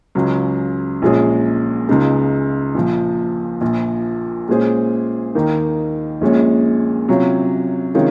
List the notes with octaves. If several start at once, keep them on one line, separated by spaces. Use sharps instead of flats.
C#2 C#3 F#3
A#1 A#2 G#3 C#4 G#4
C#2 C#3 G#3 D#4
A#1 A#2 F3
A#1 A#2 F3
A#2 G#3 C#4 G#4 C5
D#2 D#3 A#3 D#4
A#1 A#2 G#3 C#4
C3 F#3 C#4 F4
C3 D#3 G#3 C#4 F4